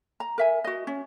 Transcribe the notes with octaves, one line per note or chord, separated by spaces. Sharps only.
A#5
A#4 E5 G#5
F#4 D#5
C#4